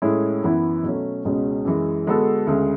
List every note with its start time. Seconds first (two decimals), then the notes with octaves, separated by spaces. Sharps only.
0.02 A2 G#3 C#4 E4 G#4
0.43 F#2 E3 B3 E4
0.83 B2 F#3 A3 C#4
1.25 C#2 B2 G#3 C#4 F#4
1.65 F#2 E3 G#3
2.07 D3 G#3 B3 F#4 A4
2.47 D2 C#3 G#3